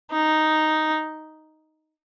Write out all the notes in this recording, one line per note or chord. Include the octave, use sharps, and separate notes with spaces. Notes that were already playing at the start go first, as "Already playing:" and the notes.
D#4